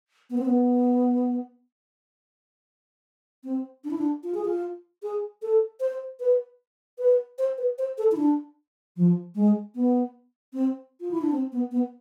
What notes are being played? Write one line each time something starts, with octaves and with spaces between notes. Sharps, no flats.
B3
C4
B3
C4
D4
E4
D4
F4
G#4
F4
G#4
A4
C5
B4
B4
C5
B4
C5
A4
E4
D4
F3
G#3
B3
C4
F4
E4
D4
C4
B3
B3